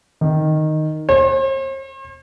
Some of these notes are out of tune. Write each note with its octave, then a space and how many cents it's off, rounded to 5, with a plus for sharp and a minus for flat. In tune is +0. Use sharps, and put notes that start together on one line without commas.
D#3 -5
C5 +45